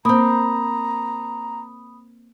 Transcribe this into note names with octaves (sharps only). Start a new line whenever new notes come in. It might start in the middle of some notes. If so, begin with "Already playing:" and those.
A#3 C4 A#5 B5 D#6